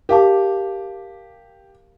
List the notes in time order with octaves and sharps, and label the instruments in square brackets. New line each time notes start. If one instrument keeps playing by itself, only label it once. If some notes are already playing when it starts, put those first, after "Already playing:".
[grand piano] G4 [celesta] A#4 F5 A5 D6